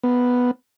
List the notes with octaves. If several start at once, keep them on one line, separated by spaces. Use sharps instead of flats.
B3